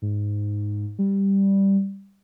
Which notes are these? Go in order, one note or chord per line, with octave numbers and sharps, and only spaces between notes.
G#2
G3